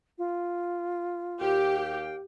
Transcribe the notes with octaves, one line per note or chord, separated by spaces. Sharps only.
F4
D#2 G4 F5 G5